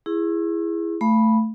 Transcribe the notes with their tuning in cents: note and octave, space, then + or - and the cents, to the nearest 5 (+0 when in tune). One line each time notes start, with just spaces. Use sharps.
E4 +15 G#4 -10 C#6 -45
A3 +5 F5 -20 B5 -10